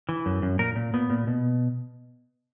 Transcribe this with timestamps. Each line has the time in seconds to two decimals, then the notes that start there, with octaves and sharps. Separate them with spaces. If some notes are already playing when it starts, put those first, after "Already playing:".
0.09 E3
0.26 F#2
0.42 F#2
0.59 A#2 A#4
0.76 A#2
0.94 A#2 B3
1.10 A#2
1.27 B2